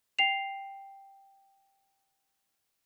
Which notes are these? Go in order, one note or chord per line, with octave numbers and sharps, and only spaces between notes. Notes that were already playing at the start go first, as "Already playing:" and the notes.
G5 C7 F7